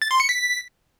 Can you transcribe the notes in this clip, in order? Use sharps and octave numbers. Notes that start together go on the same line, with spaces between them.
A6
C6
C#7
B6